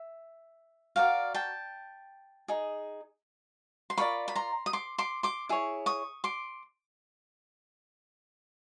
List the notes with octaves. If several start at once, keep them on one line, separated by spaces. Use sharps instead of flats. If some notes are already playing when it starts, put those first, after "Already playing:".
Already playing: E5
F#4 A#4 D5 F5 G5
G5 A5
D#4 G#4
C6
F4 A#4 D5 B5 C#6
B5
A#5 C6
D#6
C6 D6
C6 D6
C6 D6
E4 G#4 C#5
C#6 D#6
C6 D6